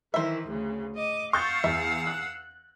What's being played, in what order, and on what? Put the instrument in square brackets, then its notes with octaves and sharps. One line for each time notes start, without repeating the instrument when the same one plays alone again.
[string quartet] D#3 E3 [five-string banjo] C5 E5
[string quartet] D2 C#3
D#5 D6
[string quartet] F5 F#5 E6 [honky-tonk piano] C#6 G6 A6
[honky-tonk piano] E2 [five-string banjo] E5
[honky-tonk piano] F#6